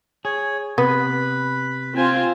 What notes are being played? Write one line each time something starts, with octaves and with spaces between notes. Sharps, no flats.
G#4 C#5
C3 B3 B4 B5
C4 F4 G#5